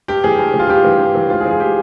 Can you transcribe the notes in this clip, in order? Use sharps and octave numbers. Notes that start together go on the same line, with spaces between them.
G2 G4
E3 G#4
G2
E3
F4
G2 G4
E3
G2
E3
G#2 F4
G#4
E3
G#4
G4